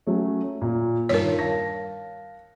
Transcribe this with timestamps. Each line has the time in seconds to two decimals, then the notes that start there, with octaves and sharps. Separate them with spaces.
0.07 F#3 A3 C#4
0.62 A#2
1.09 G2 D#3 F4 A#4 C#5
1.39 F5 A5 A#6